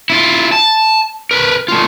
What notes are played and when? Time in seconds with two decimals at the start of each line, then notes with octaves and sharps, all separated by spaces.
0.10 E4 F4
0.52 A5
1.31 A#4 B4
1.68 A3 F4